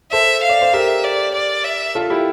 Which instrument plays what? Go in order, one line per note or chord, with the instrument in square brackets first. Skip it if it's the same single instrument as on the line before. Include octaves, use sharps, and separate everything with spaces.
[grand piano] A4 C5 [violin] E5
[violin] F5
[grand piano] D5
C5
[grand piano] G4 A#4 [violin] E5
[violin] D5
D5
E5
[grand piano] F4 A4
E4 G4